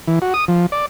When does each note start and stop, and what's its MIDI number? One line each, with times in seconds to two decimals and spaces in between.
0.07 0.19 52
0.22 0.34 66
0.34 0.45 87
0.48 0.66 53
0.72 0.86 74